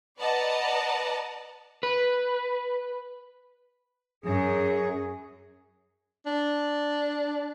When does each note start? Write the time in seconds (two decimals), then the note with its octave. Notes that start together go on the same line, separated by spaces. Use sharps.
0.18 B4 D5 D#5 F#5 A5 A#5
1.83 B4
4.24 F#2 G#4
6.26 D4